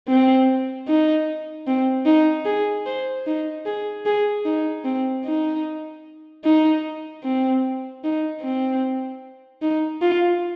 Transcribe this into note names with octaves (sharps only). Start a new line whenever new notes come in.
C4
D#4
C4
D#4
G#4
C5
D#4
G#4
G#4
D#4
C4
D#4
D#4
C4
D#4
C4
D#4
F4